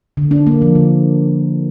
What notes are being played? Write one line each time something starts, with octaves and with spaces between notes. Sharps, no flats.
D3
D4
A#3
F3
D3